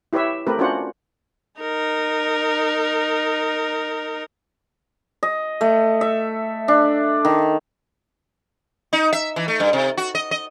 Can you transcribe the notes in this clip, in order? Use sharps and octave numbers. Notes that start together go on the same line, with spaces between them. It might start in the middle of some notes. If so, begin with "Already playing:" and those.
E4 G4 B4 C#5 E5
A3 C4 G4 A#4 B4
C#4 D4 F4 F#4 C5 F#5
D#4 A#4
D#5
A3
E5
D4
D#3
D#4
E5
E3
A3
G2
C3
F#4
D#5
D#5